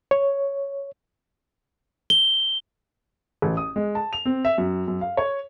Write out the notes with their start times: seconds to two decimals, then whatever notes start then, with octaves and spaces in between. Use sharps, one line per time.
0.11 C#5
2.10 G7
3.42 A1
3.57 D#6
3.76 G#3
3.95 A5
4.13 F7
4.25 C4
4.45 E5
4.58 F#2
4.88 F#2
5.01 F5
5.17 C#5